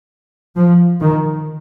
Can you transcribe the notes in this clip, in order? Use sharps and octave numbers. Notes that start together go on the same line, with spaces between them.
F3
D#3